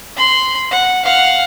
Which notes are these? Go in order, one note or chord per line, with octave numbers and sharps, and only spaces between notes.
B5 C6
F#5
F5 F#5